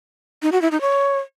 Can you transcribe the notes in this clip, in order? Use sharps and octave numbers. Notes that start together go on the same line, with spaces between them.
D#4
F#4
E4
D#4
C#5